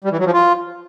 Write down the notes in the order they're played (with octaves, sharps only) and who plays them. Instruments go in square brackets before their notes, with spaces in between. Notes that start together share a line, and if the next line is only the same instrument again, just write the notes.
[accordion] G3
E3
F#3
F3
F4